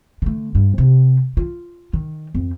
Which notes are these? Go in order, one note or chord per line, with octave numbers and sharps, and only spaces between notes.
D3 A3
G2
C3 C4
F4
D#3
F2